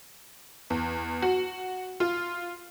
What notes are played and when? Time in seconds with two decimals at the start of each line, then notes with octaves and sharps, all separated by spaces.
0.70 E2
1.22 F#4
2.00 F4